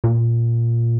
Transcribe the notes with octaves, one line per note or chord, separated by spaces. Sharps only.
A#2